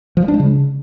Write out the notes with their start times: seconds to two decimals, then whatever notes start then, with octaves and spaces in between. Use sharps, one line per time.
0.17 F3
0.22 G3
0.28 D4
0.34 G#3
0.40 C#3